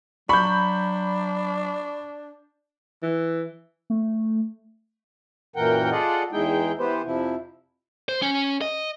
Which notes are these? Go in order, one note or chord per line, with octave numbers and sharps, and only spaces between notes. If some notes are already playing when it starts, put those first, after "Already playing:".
F#3 D4 B5 C#6 G6
E3
A3
F#2 A#2 E3 A#4 F#5 G5
F4 G#4 A4 D5 D#5 F#5
E2 G#3 D#4 E4 G#4 G5
E3 B3 G4 B4 C5
F2 C3 F3 E4
C5
C#4
D#5